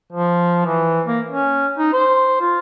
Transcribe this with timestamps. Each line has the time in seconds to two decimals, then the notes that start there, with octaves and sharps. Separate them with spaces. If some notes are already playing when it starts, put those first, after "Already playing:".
0.12 F3
0.65 E3
1.06 A#3
1.29 C#4
1.78 D#4
1.93 C5
2.40 F4